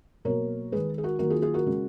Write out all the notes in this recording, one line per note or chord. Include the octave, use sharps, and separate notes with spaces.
B2 F#3 A#3 A#4 C#5
D#3 G#3 G#4 B4
G#4
F#4 A#4
D#3 F#3 A#3 F#4 A#4
F4 G#4
F4 G#4
F#4 A#4
C#3 G#3